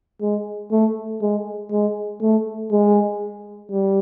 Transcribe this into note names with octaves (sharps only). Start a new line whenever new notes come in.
G#3
A3
G#3
G#3
A3
G#3
G3